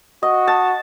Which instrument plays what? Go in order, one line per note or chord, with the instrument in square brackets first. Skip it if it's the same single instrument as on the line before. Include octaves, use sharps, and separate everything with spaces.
[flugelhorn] F#4 [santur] D#5
[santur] A5